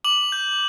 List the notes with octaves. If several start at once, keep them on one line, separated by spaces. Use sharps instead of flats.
D6 F#7
G6